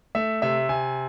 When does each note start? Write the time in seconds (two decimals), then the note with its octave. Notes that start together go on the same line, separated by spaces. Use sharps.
0.15 A3 E5
0.42 C3 E5
0.69 C3 G#5